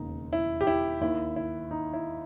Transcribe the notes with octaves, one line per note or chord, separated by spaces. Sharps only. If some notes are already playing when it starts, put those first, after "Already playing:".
Already playing: E1 D#2 C#3 D#4
E4
G4
E4
D#2 D#3 E4
E4
D#4
E4